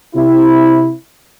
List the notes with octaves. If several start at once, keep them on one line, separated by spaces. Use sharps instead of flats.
C3 E4